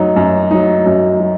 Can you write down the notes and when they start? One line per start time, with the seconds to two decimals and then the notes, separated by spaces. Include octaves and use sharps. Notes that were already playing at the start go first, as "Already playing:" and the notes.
Already playing: F#2 F#3 D#4
0.16 F#2
0.51 F#3 D#4
0.86 F#2
1.20 F#3